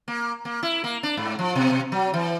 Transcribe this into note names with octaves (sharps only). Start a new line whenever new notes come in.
A#3
A#3
E4
A#3
D4
G#2
F3
B2
F#3
E3